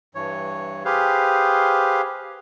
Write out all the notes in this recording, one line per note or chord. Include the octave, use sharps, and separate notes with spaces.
G2 E3 C#5
G4 G#4 B4 C5 F5